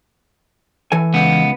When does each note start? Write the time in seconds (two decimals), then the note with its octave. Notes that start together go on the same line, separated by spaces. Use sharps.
0.92 E3 A4 G#5
1.14 C#2 B3